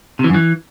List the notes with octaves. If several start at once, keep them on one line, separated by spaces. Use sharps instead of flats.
C3
E3
F#2
E3